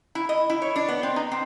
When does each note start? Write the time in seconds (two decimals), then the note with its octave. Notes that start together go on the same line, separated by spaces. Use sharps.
0.15 E4
0.29 D#5
0.50 E4
0.62 C#5
0.76 D4
0.88 B3
1.03 C4
1.16 D#4
1.32 C4